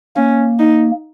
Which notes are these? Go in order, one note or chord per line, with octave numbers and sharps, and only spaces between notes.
A#3 C#4
D#4